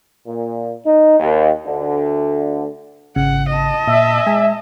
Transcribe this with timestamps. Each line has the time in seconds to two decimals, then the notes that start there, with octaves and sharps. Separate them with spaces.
0.27 A#2
0.85 D#4
1.19 D#2
1.67 D2 D3
3.16 G#1 C#3 F#5
3.49 D#5 A5
3.87 A#2 E5
4.27 G#3 G#5